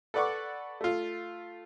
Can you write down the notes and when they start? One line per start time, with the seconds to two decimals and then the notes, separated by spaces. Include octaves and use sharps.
0.14 A4 B4 D5 F#5 C#6 D6
0.81 A3 F4